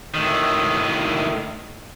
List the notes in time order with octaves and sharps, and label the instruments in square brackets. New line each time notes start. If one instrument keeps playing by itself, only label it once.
[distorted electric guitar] A2 D#3